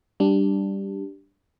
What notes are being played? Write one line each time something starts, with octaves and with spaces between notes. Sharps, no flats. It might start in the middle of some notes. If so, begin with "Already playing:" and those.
G3 D4